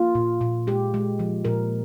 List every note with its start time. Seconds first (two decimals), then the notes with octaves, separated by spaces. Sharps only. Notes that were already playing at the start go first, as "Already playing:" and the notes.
Already playing: A#3 F4
0.15 A#2
0.41 A#2
0.67 G#3 G4
0.94 G#3
1.19 F3
1.45 A#2 A#4